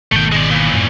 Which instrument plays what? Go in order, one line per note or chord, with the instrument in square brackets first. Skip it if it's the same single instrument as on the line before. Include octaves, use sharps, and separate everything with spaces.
[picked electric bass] G#1 B2 D#3 [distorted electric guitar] A3 G5
[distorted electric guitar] G#3 D5
A#2 E3
[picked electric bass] F#2 A2